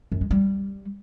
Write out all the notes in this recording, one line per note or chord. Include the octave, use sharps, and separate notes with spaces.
F#2
G#3
G3